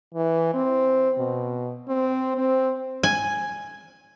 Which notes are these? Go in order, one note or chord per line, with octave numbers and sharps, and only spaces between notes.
E3
C4
B2
C4
C4
G#5